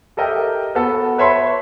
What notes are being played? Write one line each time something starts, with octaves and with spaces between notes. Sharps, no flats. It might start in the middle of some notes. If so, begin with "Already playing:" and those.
G4 A4 A#4 D#5 E5 G5
B3 F#4 A4
B4 C#5 E5 A5 B5 C6